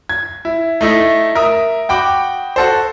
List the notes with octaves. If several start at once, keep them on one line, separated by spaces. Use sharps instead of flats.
G#6
E4
A3 D#4 E4
A#4 E5 D#6
F#4 G5 B5 D6
F#4 A4 C5